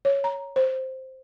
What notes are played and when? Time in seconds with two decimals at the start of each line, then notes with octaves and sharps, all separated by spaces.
0.05 C#5
0.24 A#5
0.56 C5